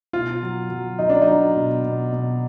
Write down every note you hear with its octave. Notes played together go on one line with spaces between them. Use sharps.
B2 F4
F#3
F#3
F#3 D#4
D4
F#3 D#4
B2
B2
B2